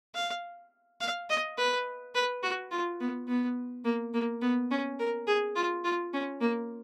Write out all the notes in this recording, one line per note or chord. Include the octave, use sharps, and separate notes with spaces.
F5
F5
D#5
B4
B4
F#4
F4
B3
B3
A#3
A#3
B3
C#4
A#4
G#4
F4
F4
C#4
A#3